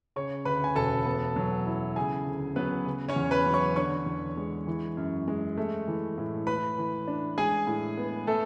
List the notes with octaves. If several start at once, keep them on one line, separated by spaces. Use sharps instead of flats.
C#3 C#5 C#6
D2 B4 B5
G#5
E1 A4 A5
B3
F#3
E4
C#3 G#4 G#5
D2
F#3 B3 B4
C#3
C#4 C#5
E2
B4 B5
F#3
C#5 C#6
D3 C#5 C#6
E2
G#3
E3
F#2
G#3
A3
E3
A2
A3 B4 B5
E3
D4
G#3 G#4 G#5
A2
B3
A3 A4